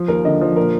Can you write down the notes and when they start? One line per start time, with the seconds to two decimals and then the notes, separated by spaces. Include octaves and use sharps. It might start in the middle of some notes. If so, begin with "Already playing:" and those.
Already playing: F3
0.08 D#2 A#4
0.25 D3 D#5
0.41 F3
0.56 A#2 A#4